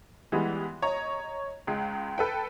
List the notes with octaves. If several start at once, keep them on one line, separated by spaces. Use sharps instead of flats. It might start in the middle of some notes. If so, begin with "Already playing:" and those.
E3 G3 G#3 B3
C#5 D#5 A#5
C#2 G#3 C7
A4 B4 G5